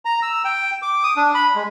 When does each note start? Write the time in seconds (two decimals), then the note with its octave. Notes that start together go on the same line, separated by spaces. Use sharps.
0.05 A#5
0.22 E6
0.45 G5
0.82 D6
1.04 D#6
1.17 D4
1.35 B5
1.55 G#3